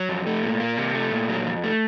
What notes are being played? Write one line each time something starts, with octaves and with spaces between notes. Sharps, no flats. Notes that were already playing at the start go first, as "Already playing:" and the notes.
Already playing: F#3
F2
A3
A#2
A#3
C3
A3
A#2
F#3
F2
A3